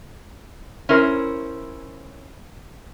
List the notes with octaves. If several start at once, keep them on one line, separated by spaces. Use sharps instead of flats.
C#4 E4 A#4 C5